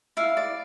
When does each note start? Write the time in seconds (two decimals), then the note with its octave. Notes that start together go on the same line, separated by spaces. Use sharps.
0.17 E4 F5
0.37 D5